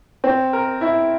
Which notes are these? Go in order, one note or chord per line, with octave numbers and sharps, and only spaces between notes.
C4
A#4
E4